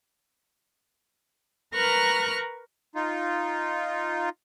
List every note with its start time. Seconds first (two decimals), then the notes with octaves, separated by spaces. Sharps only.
1.74 A#4 B4 A#5 C#6 F6 F#6
2.95 D#4 F4